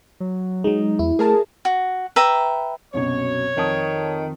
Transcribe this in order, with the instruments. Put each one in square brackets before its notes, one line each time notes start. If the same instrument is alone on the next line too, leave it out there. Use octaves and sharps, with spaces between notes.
[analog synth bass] F#3
[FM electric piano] F#3 G#3 [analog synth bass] D#4
[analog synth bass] E2 [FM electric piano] E4
[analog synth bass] A3 [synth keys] G#4 A#4 A5
[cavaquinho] F#4
B4 E5 G5 A#5
[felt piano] C2 F#2 B2 [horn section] C#5
[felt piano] F2 A5 D#6 [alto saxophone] D#3